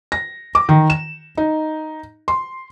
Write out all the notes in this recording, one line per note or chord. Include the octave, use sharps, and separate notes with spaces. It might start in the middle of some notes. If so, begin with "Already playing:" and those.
A#6
D6
D#3
E7
D#4
C6